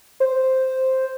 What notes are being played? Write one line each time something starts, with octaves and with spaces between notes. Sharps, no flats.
C5